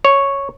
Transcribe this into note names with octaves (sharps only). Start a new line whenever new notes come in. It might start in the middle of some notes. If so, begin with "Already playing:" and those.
C#5